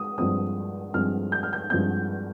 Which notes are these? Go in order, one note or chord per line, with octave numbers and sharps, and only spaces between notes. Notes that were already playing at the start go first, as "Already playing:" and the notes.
Already playing: G#3 D#6
G2 F3 G#3 C4 D#6
G2 F3 G#3 C4 F6
G6
F6
G6
G2 F3 G#3 C4 G6